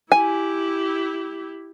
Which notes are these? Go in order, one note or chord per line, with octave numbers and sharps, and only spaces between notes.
E4 G4 G#5